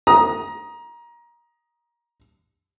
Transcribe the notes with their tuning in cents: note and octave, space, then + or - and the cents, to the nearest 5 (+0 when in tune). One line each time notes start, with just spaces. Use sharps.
A#5 +20 D#6 +0